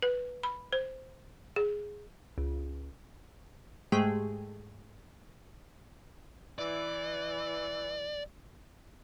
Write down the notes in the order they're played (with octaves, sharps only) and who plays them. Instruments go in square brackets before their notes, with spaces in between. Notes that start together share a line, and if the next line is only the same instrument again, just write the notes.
[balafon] B4
B5
C5
G#4
[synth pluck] C#2
G#2 G#3 A3 G4 G#4 G5
[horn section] E3 [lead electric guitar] D5